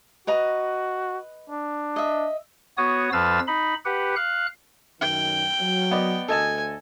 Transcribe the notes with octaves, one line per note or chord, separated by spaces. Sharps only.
F#4 B4 D#5 A#5
D4
D#5 E5
B3 F#4 C#5 D#6
F2 F3 B4 F5 E6 A6
D#4 B5
G4 B4 F#5
F5 F#6
F#2 D#3 G5
F#3
B3 D5 D#5
D2 A4 D#5 G#5 A5